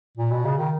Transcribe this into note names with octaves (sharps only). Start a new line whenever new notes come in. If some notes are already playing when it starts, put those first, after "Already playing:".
A#2
B2
C#3
D#3